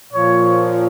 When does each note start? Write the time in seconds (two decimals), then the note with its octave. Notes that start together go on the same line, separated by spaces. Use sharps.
0.13 A#2 F3 C#5